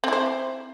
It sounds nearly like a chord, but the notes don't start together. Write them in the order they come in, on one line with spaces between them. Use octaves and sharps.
C4 E4 C5